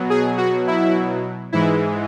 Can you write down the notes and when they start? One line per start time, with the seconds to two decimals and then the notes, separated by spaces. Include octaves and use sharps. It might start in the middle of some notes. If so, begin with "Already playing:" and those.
Already playing: B2 F#3
0.10 G#4
0.38 F#4
0.68 E4
1.52 G#2 E3 G#3 E4